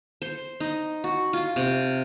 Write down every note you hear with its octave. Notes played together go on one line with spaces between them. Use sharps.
C5
D#4
F#4
F4
C3